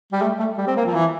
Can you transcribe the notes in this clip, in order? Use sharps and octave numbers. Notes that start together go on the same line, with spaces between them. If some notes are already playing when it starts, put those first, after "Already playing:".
G3
A3
A3
G3
C4
A#3
F3
E3